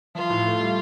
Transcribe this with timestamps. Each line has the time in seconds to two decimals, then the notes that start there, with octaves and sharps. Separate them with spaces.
0.15 F3 F4
0.30 A2
0.46 A3
0.60 G3